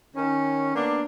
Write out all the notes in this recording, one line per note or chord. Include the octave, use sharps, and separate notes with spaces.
D#3 C#4
A#3 B3 D4